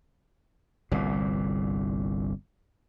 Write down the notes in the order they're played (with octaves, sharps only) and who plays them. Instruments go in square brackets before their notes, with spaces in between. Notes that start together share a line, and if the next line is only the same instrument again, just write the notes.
[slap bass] G1 C2 A#2